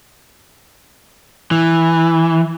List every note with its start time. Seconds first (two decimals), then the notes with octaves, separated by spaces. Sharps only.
1.51 E3